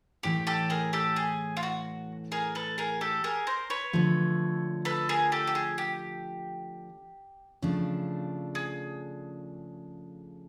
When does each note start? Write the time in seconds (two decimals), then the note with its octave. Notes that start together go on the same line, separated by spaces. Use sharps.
0.23 A2 E3 A3 G4
0.47 G4 A4
0.70 G#4 A#4
0.93 G4 A4
1.16 G#4
1.57 F4
1.63 F#4
2.32 G#4 A#4
2.55 A4 B4
2.78 G#4 A#4
3.01 G4 A4
3.24 G#4 A#4
3.47 A#4 C5
3.70 B4 C#5
3.93 D3 F3 A3
4.85 A4 B4
5.09 G#4 A#4
5.32 G4 A4
5.47 G4
5.55 G#4
5.78 G4
7.62 C#3 F3 A3 D4
8.55 G#4